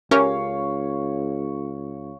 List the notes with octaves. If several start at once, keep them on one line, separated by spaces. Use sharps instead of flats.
C#2 C#4 G4 A#4 C#5 F5